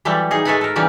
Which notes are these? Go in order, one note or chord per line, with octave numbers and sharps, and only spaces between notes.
E3 F#3 G3 A3
D#4 G#4
G#3 A3 A4 B4 F#5 G#5
A4 A#4
C#3 E3 G3 A#3 C#4